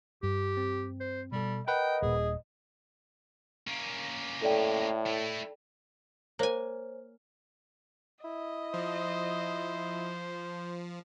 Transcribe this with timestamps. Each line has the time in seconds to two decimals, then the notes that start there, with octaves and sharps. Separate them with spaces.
0.23 G2 G4
0.57 C4
1.00 C5
1.32 B2 G3 A4
1.68 A#4 B4 D#5 F#5 G5
2.02 D#1 A#2 G#4
3.67 A#3 C#4
4.42 A2 A4 D5 G5
5.07 A3 E4
6.39 A#3 C5 C#5 G#5
8.24 E4 D#5
8.74 F3 C5